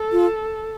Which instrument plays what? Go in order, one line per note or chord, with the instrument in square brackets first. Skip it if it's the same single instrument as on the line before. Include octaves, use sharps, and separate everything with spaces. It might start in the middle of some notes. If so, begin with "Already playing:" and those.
Already playing: [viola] A4
[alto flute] F4